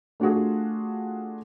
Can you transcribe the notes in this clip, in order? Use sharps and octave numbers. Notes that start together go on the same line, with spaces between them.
A3 D4 F4 F#4 G#4